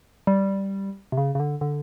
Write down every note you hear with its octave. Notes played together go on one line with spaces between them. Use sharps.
G3
C3
C#3
C#3
D3
D3